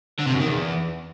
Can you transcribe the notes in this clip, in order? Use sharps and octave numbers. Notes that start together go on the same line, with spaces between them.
D3
C3
F#2
D#3
E2